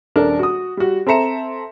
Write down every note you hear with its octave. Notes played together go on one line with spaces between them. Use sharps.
D#1 D4 A4 A#4
F#4 D#6
G3 F#4
C4 A4 E5 A#5 C#7 E7